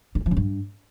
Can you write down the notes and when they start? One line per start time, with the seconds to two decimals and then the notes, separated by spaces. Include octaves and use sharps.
0.15 D3
0.21 D#3
0.26 F3
0.31 C#3
0.37 G2